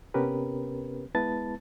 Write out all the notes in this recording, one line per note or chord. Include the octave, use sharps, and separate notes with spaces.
C3 B3 C#4 G4 A#4 B4
G#3 B3 E4 B4 A5 A6